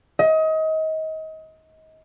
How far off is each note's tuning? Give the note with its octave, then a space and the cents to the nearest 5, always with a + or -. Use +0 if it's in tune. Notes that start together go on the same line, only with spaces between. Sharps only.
D#5 +30